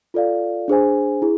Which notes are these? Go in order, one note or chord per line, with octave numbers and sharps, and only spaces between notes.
F4 A4 D5 F5
D4 G#4 C5 G#5
E4 G#4